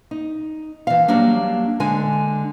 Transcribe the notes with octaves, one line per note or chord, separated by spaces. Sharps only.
D#4
E3 F5
F#3 G3 A#3 D4
D3 G#3 G#5